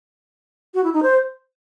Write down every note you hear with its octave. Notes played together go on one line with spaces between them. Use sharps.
F#4
E4
D#4
C5